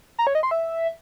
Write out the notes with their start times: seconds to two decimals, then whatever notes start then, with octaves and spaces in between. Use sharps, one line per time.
0.19 A#5
0.27 C#5
0.35 D#5
0.43 C6
0.51 E5